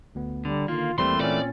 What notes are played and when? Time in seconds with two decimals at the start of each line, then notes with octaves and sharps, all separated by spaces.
0.15 D2 B3
0.45 D3 G3
0.68 D3 D#3 A#3 F4
0.98 D#2 E3 G3 A3 A#3 C4 C5 C6
1.20 A#2 C#4 D5